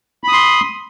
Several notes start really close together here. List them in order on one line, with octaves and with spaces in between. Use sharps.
B5 D#6 C6